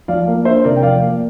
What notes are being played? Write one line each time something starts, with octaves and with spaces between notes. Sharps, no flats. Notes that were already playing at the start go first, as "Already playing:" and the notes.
F3 D5 F5
A#3
D4 C5 E5
C3 A#4 D5
G5
F3 D5 F5
A#3